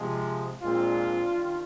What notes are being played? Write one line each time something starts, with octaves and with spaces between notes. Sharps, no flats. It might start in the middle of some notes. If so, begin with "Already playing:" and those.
Already playing: C3 F3 G#3
A#2 G#3 C4 D4 F4
D#3 G3